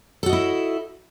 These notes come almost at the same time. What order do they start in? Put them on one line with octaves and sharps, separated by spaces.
A4 F#4 D#5 E4